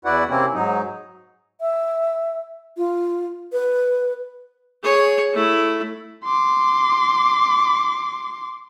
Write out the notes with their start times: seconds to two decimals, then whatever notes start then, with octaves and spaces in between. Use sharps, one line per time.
0.05 E2 E4 F#4 B4 D5 F#5
0.29 C3 A#3 C4 C#4 E4
0.54 G#2 F#3 D#4
1.61 E5
2.77 F4
3.53 B4
4.83 G#4 C#5
5.33 A3 E4
6.25 C6 D6